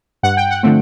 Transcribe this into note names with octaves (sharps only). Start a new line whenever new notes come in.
G2 F#5
G5
F#5
D3 F3 A3 C4